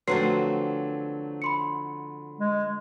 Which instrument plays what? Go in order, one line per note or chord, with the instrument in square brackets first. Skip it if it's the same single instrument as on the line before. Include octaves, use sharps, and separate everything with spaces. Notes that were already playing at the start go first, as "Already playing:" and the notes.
[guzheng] D3 F3 C4 [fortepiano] F#3 A3 [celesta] B4 C6 C7
[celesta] B5 C6 C#7
[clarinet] G#3